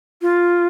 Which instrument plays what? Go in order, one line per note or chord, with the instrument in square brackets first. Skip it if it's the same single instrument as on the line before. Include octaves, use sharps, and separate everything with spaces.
[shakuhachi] F4